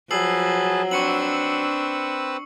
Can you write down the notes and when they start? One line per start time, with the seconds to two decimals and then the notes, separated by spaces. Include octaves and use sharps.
0.11 F3 F#3 G#4 B4 A5 E6 C7 F#7
0.91 C4 D4 B4 C#6 E6 C#7 F#7